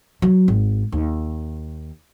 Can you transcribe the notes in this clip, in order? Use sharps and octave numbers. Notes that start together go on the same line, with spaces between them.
F#3
G#1
D#2